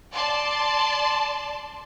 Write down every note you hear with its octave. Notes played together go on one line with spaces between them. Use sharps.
D5 A5 C6